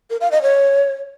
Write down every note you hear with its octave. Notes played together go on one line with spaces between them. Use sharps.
A#4
F5
D#5
C#5